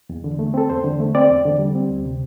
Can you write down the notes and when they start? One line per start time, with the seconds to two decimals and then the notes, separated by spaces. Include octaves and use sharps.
0.10 E2
0.24 D3
0.39 A3
0.54 C4 A4
0.69 E2 C5
0.84 D3
1.00 A3
1.15 C4 D5
1.30 E2
1.45 D3
1.59 G3
1.75 C4
1.90 D2
2.05 C3